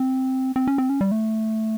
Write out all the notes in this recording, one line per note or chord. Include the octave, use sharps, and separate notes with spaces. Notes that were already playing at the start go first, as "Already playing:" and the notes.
Already playing: C4
C4
C#4
C4
C#4
G3
A3